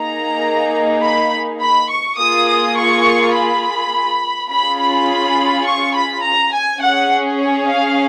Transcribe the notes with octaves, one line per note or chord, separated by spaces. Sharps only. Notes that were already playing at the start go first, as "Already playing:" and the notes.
Already playing: A#3 D#4 G#4 A#5
B5
B5
C#6
A#3 F4 G#4 D#6
D#6
C#6
B5
C#4 F4 G#4 B5
B5
C#6
B5
A#5
G#5
C#4 G#4 F#5
C#5
F5